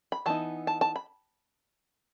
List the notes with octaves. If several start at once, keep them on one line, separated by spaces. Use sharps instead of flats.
B5
E3 B3 D#4 A5
A5
A5
B5